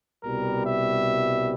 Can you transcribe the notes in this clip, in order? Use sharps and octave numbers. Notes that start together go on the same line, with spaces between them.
C2 B2 G3 A#4
E5